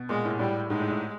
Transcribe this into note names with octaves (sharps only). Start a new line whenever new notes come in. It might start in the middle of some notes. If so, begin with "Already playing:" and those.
Already playing: B2
A#2 G#3
A2
A2 G3
G#2 G#3
A2
A2